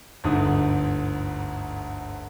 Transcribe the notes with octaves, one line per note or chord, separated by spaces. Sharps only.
G1 D2 G#2 D3 D#6